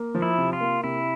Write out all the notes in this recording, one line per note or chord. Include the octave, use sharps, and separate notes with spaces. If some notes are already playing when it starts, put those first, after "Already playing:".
Already playing: A#3
F3
E4
C3
F4
A#3
C3 E4